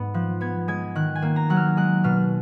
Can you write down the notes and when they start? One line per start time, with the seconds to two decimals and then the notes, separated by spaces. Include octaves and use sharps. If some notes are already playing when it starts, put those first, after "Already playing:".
Already playing: G#2 B3
0.14 F3 F#6
0.41 B3 G#6
0.68 G#3 G#6
0.95 D#3 F#6
1.15 G#5
1.22 A#3
1.36 A#5
1.50 F#3 F#6
1.56 F6
1.77 G#3 F#6
2.04 B2 F6